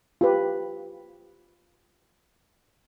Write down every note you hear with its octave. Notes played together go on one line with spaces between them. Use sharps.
F4 G4 B4